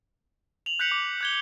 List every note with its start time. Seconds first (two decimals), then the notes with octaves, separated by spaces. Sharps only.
0.66 F7 F#7
0.79 F#6 G6 B6 C#7 F7 F#7
0.92 D6
1.21 F#6 G#6 G7